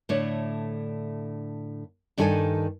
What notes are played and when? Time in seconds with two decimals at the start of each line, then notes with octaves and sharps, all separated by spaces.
0.09 A2 D3 A3 D4 C#5
2.18 G2 D#3 D4 A4 B4 G#5